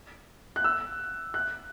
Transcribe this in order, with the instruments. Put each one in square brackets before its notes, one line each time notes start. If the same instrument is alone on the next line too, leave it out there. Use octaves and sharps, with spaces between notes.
[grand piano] F#6
E6
F#6